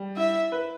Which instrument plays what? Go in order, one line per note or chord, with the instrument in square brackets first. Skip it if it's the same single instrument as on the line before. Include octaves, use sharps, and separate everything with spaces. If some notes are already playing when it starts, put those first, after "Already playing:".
Already playing: [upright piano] G3
[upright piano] E4 [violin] E5
[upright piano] B4